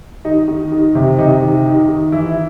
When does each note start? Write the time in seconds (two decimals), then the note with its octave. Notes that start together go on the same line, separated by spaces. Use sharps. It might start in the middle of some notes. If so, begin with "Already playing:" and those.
0.25 D#3 D#4
0.48 D#3
0.72 D#3
0.95 C3
1.18 C3 D#4
1.42 D#3
1.66 D#3
1.88 D#3
2.12 E3 E4